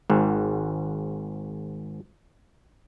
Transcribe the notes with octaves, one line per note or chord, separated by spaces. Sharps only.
G#1 G#2